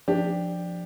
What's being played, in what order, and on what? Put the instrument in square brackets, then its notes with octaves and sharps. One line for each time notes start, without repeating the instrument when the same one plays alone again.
[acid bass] F3 [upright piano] D4 G4